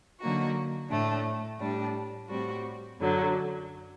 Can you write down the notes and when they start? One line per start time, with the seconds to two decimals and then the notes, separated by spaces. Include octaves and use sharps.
0.21 D3 F#3 A#3 D#4 F#4
0.90 A2 A3 D4
1.59 A2 G3 D4
2.29 A2 G3 C4 F#4
2.99 F#2 D3 F#3